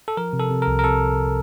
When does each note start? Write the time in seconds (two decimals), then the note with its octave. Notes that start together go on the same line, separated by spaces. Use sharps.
0.08 A4
0.17 F3 A#4
0.33 C3
0.39 A4
0.50 C3
0.62 A#4
0.67 C2
0.79 A#4
0.84 C3 A4